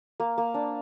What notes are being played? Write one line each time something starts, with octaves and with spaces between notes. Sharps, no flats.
A#3
A#3
D4